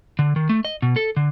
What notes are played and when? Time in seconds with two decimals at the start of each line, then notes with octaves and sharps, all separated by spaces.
0.19 D3
0.36 D#3
0.49 A3
0.65 D#5
0.82 B2
0.96 A4
1.17 D3